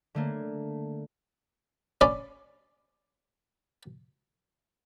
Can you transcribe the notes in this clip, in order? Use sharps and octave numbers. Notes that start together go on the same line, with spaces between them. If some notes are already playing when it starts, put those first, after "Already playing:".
D3 A3 A#3
C#4 D5 B5